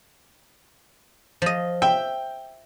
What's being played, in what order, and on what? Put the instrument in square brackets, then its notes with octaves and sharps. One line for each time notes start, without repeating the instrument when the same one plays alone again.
[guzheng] F3 D#5
[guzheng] E5 [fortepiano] G5